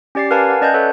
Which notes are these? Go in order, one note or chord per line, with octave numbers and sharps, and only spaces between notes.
C#4 G4 D5 A6 C7
A#4 B4 F5 G#5 A5
F#5
C#4 D5 D#5 A5 F#6 G6
A4 B4 C#5 D#5 E5 F#5